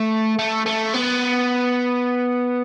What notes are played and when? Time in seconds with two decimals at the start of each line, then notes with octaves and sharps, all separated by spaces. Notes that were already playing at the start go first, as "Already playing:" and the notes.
Already playing: A3
0.39 A3
0.66 A3
0.94 B3